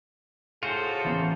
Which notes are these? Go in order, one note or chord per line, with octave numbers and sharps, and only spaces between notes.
A2 F4 F#4 G#4 A4 C5 C#7
A1 A#3